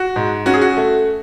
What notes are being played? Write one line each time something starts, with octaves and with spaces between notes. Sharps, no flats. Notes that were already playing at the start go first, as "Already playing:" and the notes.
Already playing: F#4
G#2
C#4 F#4
G#4
F#4
A3